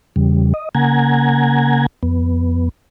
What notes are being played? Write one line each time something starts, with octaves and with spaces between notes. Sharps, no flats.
E2 C#3 G3
D#5
C#3 A#3 F#5 G#5 A#5 G#6
F2 B3